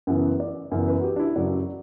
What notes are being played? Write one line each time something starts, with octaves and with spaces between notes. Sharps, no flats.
F#2 C#3 E3 B3 F#5
D5
F#2 C#3 E3 B3
B4
F#4
G4
D4
E4
F#2 C#3 F#3 D5